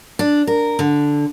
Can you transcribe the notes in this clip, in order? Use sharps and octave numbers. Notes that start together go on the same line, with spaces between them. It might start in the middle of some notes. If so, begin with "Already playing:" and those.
D4
A#4
D3